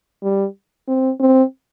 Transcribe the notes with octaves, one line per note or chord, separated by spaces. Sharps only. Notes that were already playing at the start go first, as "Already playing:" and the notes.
G3
C4
C4